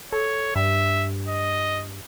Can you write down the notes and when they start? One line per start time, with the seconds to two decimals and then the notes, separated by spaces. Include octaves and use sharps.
0.12 A4 C#5
0.56 G2 E5
1.28 D#5